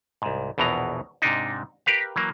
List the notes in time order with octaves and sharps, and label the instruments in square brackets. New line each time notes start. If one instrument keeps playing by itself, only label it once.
[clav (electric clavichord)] C2 G#2
A#1 E2 B2 E3 A#5
G#2 C3 D4 D#4
G4 A#4 B4 F5
E3 F#3 A#3